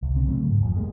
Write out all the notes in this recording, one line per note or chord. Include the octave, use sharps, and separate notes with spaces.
C2
C#3 C4
C#3 F#3 G3 A3
G#2
F2 E3 F3
G3 G#3 A#3